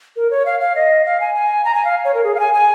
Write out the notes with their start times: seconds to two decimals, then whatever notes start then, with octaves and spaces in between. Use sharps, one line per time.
0.16 A#4
0.31 C#5
0.46 F5
0.60 F5
0.75 D#5
1.05 F5
1.20 G#5
1.35 G#5
1.65 A#5
1.75 G#5
1.85 F5
2.05 C#5
2.14 A#4
2.24 G#4
2.35 F5
2.39 G#5
2.54 G#5